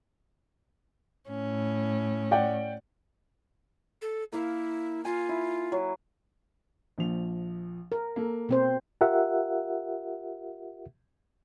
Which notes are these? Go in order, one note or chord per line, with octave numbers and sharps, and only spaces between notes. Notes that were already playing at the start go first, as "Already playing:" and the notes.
A2 C#4
D5 F#5 G5
A4
A#3 E4 F5
F4 G#5
E4
F#3
A#1 F3 F7
A#4
A#3 A4
B2 C4 C5
F4 G4 A#4 E5 F#5